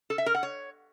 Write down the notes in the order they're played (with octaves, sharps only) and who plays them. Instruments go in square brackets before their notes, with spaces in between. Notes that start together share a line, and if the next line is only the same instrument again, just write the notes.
[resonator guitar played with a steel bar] A4
E5
A#4
F#5
C#5